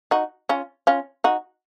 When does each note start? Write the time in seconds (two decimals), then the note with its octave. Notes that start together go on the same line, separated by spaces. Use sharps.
0.11 D#4 F#4
0.49 C#4 F4
0.87 C#4 F4
1.24 D#4 F#4